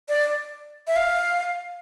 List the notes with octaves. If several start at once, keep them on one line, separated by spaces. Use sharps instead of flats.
D5
E5
F5